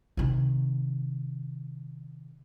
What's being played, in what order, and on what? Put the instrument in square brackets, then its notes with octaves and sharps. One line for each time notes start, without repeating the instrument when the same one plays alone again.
[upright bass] C3 D#3